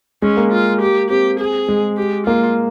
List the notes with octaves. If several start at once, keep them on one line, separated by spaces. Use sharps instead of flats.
G#3 C#4
A#3
F4
G4
C4 G4
G#4
G#3
G4
A#3 F4